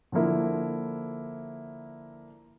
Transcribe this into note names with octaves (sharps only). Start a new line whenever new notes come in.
D3 F3 A#3 E4